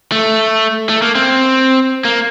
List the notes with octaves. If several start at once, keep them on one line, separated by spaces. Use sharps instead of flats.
A3
A3
A#3
C4
A#3